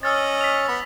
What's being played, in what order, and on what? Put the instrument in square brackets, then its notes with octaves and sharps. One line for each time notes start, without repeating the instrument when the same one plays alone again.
[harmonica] C#4 D#5 [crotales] E6 F6 A6
[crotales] B6 F7
[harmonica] B3